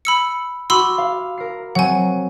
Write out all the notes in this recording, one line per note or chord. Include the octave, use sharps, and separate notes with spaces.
B5 E6 C#7
F#4 G4 B5 C6 E6
F5
A#4 C7
F#3 C4 F#5 G#5